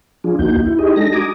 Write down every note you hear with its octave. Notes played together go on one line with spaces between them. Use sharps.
F3 D4 F4 G#4
D2 A#3 D#4 F#4 G6
E4
D#4 G4 G#4 D#5
G#3 D4 D#4 A4 A#6
F#4 G#5 A#5 D6 D#6